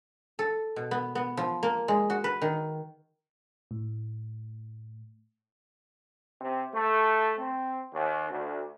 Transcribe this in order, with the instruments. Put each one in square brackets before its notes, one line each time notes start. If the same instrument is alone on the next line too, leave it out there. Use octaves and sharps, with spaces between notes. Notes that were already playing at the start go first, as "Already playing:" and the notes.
[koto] A4
B2
B3
B3
F3
A#3
G#3
F#4
B4
D#3
[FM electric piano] A2
[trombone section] C3
A3
C4
D#2
D2